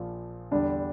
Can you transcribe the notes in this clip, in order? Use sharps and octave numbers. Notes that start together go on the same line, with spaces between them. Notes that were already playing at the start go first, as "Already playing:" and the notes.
Already playing: A#1 A#2 F3
E2 D3 G3 D4